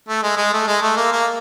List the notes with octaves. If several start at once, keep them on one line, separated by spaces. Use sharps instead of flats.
A3
G#3
G#3
A3
G#3
A3
A#3
A#3